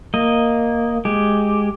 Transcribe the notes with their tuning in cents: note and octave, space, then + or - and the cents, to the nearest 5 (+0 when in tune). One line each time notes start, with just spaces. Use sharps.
A#3 +0 D#5 +0
G#3 +0 G4 +0